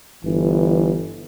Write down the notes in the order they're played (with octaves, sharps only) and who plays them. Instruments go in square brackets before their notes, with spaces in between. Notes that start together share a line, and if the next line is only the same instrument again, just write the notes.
[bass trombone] G1 [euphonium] E3